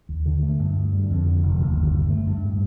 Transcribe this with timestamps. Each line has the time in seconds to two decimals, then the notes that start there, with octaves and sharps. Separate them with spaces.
0.09 D#2
0.26 D3
0.43 A3
0.59 G2
0.76 D2
0.92 D3
1.10 F2
1.27 D3
1.43 F1
1.60 D#2
1.77 G1
1.93 G2
2.10 A3
2.27 G2
2.44 A2